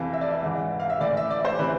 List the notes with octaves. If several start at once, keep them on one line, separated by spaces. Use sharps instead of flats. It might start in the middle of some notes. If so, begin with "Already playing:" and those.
Already playing: F2 C3 E3 F5
E5
D5
E5
G#2 E3
F5
E5
A2 E3 D5
E5
D5
C5
C3 E3 B4